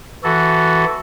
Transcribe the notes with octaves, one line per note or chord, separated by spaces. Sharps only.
E3 F#4 A4